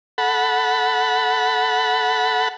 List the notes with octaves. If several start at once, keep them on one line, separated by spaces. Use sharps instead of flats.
A4 F#5 B5